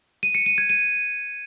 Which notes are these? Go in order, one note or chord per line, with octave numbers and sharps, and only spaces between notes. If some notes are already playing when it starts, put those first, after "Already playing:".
D#7
C#7
D#7
G#6
D#7